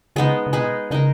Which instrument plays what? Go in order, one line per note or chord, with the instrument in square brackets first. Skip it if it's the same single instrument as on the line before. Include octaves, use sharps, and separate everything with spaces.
[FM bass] C#3 [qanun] G#3 B3 D#4
[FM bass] C#3
[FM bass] B2 [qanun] G#3 D#4 G#4 B4
[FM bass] C#3 [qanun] G#3 D#4 A#4